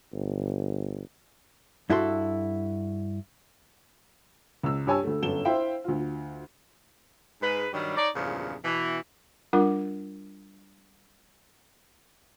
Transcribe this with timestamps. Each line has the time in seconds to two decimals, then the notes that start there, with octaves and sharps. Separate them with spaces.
0.13 G1
1.90 G2 E4 F#4 A4 C6
4.63 C#2 E6
4.86 G2 G4 C#5 G#5 A5 E6
5.03 D2 A3
5.22 G1 F#2 A4 E7 G7
5.45 E4 C5 E5 F5 G5
5.84 D2 F4
7.42 G#2 G#3 B4
7.74 G2 D#3 F#3 G3
7.97 D#4 C#5 D5
8.15 E2 G2 A#2 C#3 F3
8.64 B2 E3
9.53 G3 D4 F4 A#4 F#5 D6